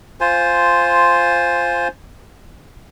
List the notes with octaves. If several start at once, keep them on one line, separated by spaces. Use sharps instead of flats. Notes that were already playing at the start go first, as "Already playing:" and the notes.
F4 C5 G#5